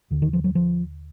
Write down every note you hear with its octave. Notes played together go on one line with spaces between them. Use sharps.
D#2 D3
D#3
F3
F#3
F3